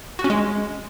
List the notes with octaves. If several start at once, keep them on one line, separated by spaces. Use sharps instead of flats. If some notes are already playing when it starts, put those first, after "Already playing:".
F#4
C#4
G#3